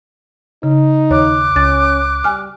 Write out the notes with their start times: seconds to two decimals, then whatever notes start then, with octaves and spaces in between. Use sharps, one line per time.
0.63 C#3 D#4
1.11 D#2 C#5 D6 F#6
1.56 C#2 C#4 A6
2.24 G3 G#5 F6